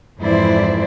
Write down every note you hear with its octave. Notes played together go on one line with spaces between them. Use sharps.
F2 G#2 E3 E4 C5 D5